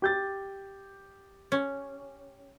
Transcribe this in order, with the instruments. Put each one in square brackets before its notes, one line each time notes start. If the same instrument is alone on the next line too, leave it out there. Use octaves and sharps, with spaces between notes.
[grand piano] G4 G6 A6
[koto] C#4